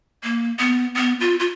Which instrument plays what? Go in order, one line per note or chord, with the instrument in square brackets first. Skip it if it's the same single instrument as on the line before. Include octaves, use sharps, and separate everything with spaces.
[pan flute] A#3
B3
B3
F4
F4